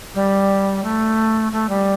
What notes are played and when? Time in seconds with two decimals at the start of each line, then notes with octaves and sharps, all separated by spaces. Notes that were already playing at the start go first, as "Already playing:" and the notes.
0.15 G3
0.83 A3
1.52 A3
1.69 G3